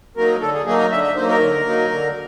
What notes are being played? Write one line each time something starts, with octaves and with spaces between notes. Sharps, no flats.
F#3 A#3 D#4 A#4
D3 A4
G#4
F#3 A#3 D#4 G#4
A#4
D3 E5
E5
F#3 A#3 D#4 C5
A#4
D3
F#3 A#3 D#4
D3